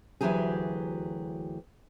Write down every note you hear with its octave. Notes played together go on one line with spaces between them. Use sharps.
D2 G2 E3 F#3 G4 G#4